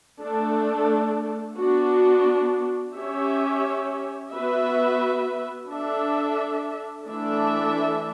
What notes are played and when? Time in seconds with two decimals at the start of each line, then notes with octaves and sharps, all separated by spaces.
0.22 A3 D4 A4
1.59 B3 D4 F#4
2.96 C#4 G4 C#5 E5
4.33 B3 F#4 B4 E5
5.70 D4 A4 E5
7.07 E3 A3 D4 A4 E5